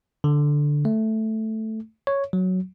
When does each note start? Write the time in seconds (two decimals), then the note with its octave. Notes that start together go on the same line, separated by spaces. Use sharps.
0.24 D3
0.85 A3
2.07 C#5
2.33 F#3